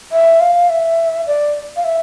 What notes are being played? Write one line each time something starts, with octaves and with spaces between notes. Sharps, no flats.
E5
F5
E5
D5
F5
E5